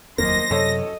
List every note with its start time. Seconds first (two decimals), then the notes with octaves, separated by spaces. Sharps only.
0.18 F1 D#2 F#3 A#3 C5 D#5 A#6
0.51 F#2 C3 F#3 A4 C#5 D#5